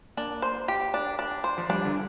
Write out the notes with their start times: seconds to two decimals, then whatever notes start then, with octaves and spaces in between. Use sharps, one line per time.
0.17 A#3 D4
0.42 C5
0.68 G4
0.94 D4
1.19 D4
1.44 C5
1.58 F3
1.69 G3 D4
1.85 D3